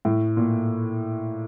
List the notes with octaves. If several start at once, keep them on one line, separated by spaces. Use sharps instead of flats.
A2
A#2